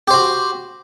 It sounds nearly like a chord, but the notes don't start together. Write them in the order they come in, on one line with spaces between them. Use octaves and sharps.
G4 C5 F#4